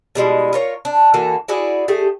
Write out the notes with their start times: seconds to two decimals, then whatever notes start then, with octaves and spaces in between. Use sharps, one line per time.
0.15 B2 G3 G#3 E4
0.53 F4 A#4 C#5
0.85 D4
1.13 E3 A#3 F#4 A4
1.48 E4 F#4 G#4 D5
1.88 A3 G4 G#4